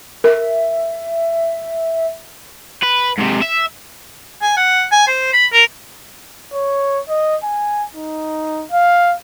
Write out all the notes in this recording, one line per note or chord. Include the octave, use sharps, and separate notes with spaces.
A#4 E5
B4
G#2 C3
E5
G#5
F#5
G#5
C5
B5
A#4
C#5
D#5
G#5
D#4
F5